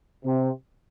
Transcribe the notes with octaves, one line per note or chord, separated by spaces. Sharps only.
C3